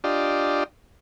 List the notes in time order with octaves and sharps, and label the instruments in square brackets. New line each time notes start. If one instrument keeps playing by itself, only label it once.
[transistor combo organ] D4 F4 G4 D5 D#5